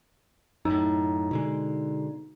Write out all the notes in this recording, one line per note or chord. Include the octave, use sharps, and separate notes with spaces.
F#2 A2 D#4
B2 D3 G#3